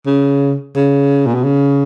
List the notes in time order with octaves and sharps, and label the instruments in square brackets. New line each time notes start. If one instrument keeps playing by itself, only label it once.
[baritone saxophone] C#3
C#3
A#2
B2
C#3